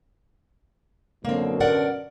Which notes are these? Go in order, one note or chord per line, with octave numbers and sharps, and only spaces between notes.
F#2 B2 D3 A#3 C4
A#4 D5 F#5